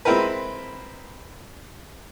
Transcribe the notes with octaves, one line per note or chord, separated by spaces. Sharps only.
G#3 C4 E4 A#4 B4